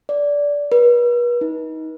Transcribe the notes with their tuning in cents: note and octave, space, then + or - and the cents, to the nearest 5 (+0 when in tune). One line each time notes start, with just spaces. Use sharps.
D5 -15
B4 -40
D#4 +25